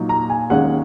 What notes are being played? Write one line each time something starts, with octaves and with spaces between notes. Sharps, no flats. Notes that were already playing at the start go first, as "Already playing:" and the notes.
Already playing: A#2 F#3 D#4
A#5
G#5
D#2 D#3 G#3 C#4 F#5